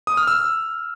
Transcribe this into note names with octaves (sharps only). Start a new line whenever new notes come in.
D#6
F6
E6